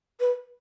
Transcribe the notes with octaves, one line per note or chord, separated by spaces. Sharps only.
B4